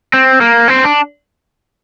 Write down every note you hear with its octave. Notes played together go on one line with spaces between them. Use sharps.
C4
A#3
C4
D4